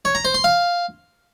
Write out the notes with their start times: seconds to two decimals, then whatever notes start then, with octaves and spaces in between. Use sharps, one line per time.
0.05 C#5
0.15 A#5
0.25 C5
0.34 C6
0.44 F5